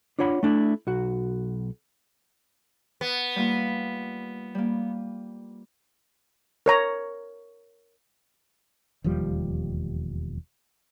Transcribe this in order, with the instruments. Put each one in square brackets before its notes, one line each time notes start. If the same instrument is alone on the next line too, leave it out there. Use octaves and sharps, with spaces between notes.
[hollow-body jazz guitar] D4 F4 C#5 F#5 B5
A3 D4 E4
B1 F#4
[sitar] B3
[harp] G3 A#3 F4
G3 A#3
[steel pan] A#4 C#5 A#5
[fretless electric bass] E1 D#2 F3 G3